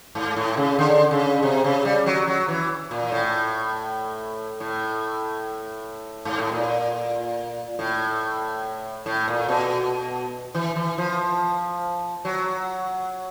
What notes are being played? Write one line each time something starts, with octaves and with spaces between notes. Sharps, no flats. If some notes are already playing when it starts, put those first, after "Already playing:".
G#2
A2
C#3
D3
C#3
C3
C#3
G3
F#3
F#3
E3
A#2
A2
A2
G#2
A2
A#2
A2
A2
A#2
B2
E3
E3
F3
F#3